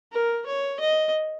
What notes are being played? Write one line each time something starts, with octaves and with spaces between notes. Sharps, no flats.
A#4
C#5
D#5